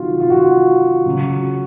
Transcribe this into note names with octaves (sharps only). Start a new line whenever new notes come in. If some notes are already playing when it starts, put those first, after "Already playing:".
Already playing: C3 D#3 F#3 F4 F#4
F4
F#4
C#3 F#3